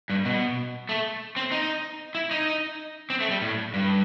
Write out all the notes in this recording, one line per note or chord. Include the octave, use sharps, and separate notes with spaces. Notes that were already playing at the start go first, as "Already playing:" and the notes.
G2
B2
A3
C4
D#4
E4
D#4
C4
A3
G3
A2
G2